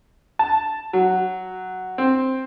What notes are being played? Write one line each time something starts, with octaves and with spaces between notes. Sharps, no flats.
A5
F#3
C4